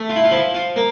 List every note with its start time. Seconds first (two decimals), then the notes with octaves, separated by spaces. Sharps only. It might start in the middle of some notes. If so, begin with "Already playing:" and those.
Already playing: A3
0.09 F4
0.16 E4
0.24 F4
0.31 F3 E4
0.54 F4
0.76 A#3